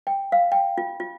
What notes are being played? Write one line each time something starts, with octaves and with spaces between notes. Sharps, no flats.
G5
F5
G5
F4
F4